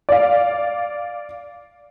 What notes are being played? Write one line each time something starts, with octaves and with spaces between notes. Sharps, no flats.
D5 F5